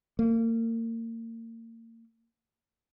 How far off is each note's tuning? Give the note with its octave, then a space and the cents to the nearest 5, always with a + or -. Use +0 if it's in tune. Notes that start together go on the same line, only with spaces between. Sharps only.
A#3 -35